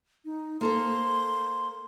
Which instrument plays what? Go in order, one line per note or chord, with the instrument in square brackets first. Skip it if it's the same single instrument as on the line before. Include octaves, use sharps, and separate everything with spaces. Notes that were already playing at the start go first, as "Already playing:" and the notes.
[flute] D#4
[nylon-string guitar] A#3 A4 C5 [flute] C6